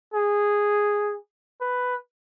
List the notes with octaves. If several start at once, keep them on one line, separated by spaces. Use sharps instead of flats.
G#4
B4